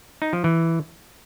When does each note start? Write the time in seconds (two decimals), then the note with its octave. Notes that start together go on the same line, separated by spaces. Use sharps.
0.22 D#4
0.33 F3
0.44 E3